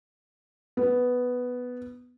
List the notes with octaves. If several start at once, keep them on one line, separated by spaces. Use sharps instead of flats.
B3